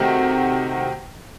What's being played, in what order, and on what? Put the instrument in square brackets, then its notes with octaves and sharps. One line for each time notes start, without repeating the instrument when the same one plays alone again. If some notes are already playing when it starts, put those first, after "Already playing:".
Already playing: [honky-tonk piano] C3 D#3 A3 C4 F#4